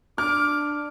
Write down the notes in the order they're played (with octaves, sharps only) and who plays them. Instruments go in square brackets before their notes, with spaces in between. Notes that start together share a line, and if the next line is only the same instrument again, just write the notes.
[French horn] D4 [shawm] D6 [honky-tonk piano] F6